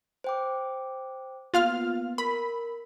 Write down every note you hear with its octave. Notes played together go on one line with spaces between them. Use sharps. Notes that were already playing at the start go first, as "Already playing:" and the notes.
C5 G5 D6
A#3 B3 F4 F5 F6
A#4 B5